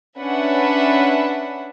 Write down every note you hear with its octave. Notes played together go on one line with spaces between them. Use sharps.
C#4 D4 B4 E5 F#5